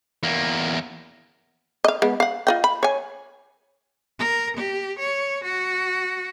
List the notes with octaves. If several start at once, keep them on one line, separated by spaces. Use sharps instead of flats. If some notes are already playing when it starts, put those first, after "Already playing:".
E2 A#3
D#5 F5
G#3 B3
F5 F#5
F4 D#5 G5
B5
C#5 G#5
A#4
G4
C#5
F#4